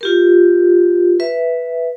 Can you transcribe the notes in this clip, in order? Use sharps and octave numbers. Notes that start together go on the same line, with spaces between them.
F4 G4 A#4
B4 E5